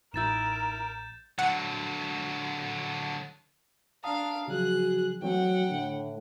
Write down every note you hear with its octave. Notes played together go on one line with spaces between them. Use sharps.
A1 D#4 E4 A#4 G6 A6 E7
D3 F#3 F#5
D4 F5 A5 A#5 D#6
C#3 F3 F#3 F#4 G#4 F#6
E3 F#3 A3 C4 F#5 G5
A2 D3 D4